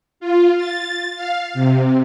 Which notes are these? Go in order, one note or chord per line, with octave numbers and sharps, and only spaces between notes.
F4
A6
F5
C3